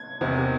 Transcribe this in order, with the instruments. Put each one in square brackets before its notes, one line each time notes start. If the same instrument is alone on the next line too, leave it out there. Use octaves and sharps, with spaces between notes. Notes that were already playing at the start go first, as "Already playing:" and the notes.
Already playing: [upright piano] G#6
E2 C3 D#3